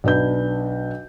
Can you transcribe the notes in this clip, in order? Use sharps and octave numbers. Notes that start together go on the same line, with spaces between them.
B1 D4 B4 G6